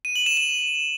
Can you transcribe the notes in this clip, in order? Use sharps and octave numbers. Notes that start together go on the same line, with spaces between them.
D#7
F#7
E7
E7